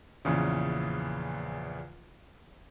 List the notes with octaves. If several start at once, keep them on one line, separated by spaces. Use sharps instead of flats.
A#1 E2 C#3